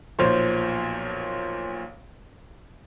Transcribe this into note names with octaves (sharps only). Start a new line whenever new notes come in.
B1 A#2 F3 C5 C#5